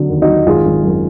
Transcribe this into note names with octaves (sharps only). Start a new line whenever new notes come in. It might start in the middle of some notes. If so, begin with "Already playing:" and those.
Already playing: D3 F#3
D#2
D#4 F#4
F#3
G#1 F4 G#4
G#1
F#2